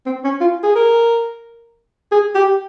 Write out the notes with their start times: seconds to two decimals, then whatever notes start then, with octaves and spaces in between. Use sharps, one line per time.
0.06 C4
0.24 C#4
0.41 F4
0.64 G#4
0.76 A#4
2.12 G#4
2.35 G4